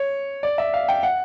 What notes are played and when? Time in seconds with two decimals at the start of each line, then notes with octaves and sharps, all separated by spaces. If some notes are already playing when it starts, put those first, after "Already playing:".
Already playing: C#5
0.43 D5
0.58 E5
0.74 F5
0.89 G5
1.03 F#5